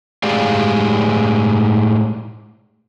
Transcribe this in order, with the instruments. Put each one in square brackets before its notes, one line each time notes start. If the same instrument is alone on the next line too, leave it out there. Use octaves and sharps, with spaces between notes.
[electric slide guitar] A2 G#3 G4 G#4 D5 F5